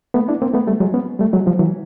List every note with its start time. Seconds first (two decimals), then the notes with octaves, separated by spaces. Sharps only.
0.14 A3 B3
0.28 D4 E4
0.42 A#3 C4
0.54 A3 B3
0.67 G3 A3
0.80 F#3 G#3
0.94 B3 C#4
1.19 G3 A3
1.33 F#3 G#3
1.46 F3 G3
1.59 E3 F#3